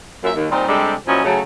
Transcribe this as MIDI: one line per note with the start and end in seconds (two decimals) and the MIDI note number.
0.24 0.31 42
0.24 0.31 46
0.24 0.31 76
0.36 0.48 39
0.51 0.64 46
0.51 0.64 55
0.51 0.64 60
0.51 0.64 63
0.51 0.64 72
0.68 0.94 48
0.68 0.94 55
0.68 0.94 56
0.68 0.94 62
0.68 0.94 67
0.68 0.94 69
1.07 1.24 46
1.07 1.24 53
1.07 1.24 54
1.07 1.24 61
1.07 1.24 64
1.07 1.24 75
1.24 1.41 49
1.24 1.41 54
1.24 1.41 57